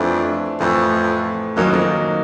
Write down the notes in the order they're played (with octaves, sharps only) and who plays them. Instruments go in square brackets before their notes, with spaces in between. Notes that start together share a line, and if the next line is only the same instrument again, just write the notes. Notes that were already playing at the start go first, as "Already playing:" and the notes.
Already playing: [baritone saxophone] F2 [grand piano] E3 A3 D4
[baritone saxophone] F2 [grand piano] A2 E3 A3
[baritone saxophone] F#2 [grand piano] D#3 F#3 A#3 D#4
[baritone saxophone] F2